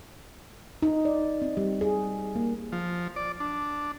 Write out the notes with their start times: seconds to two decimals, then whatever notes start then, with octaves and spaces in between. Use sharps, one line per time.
0.82 D#4
1.05 D5
1.42 C4
1.57 G3
1.81 G#4
2.35 A#3
2.72 F3
3.16 D5
3.40 D4